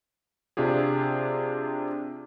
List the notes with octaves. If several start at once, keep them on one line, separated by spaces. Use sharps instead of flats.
C3 D4 F4 G4 G#4